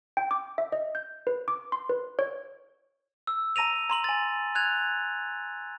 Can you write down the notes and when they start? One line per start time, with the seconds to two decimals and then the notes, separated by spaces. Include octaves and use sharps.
0.17 G5
0.31 D6
0.58 E5
0.72 D#5
0.95 G6
1.27 B4
1.48 D6
1.72 C6
1.89 B4
2.19 C#5
3.27 E6
3.56 A5 A#5 A#6 D#7 F7
3.90 A#5 C6 F#7
4.04 G#5 A6
4.55 F#6 G#6 F7